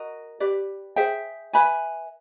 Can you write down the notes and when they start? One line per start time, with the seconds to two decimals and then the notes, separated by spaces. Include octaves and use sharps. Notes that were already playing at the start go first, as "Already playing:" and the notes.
Already playing: F#4 A#4 D#5
0.40 G4 B4 D5
0.96 G#4 C5 E5 G5
1.53 B4 E5 G#5 B5